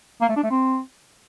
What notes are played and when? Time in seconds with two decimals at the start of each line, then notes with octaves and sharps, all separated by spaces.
0.21 A#3
0.29 A3
0.36 D4
0.43 A3
0.51 C4